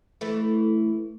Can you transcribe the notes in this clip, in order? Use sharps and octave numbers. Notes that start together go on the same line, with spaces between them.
E3 A3